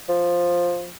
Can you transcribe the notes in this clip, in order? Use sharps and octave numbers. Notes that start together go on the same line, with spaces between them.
F3